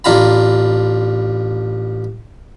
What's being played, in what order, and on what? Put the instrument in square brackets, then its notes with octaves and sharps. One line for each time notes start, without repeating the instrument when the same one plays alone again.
[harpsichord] A1 D4 F4 A#5 B5